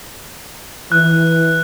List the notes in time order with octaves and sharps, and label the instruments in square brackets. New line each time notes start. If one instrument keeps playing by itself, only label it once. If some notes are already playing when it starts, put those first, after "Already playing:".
[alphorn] E3 [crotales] F#6